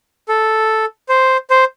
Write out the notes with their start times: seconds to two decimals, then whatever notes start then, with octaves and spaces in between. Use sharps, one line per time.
0.29 A4
1.09 C5
1.50 C5